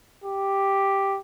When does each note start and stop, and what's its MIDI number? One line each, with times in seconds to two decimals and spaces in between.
0.24 1.19 67